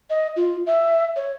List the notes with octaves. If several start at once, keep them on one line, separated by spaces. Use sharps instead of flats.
D#5
F4
E5
C#5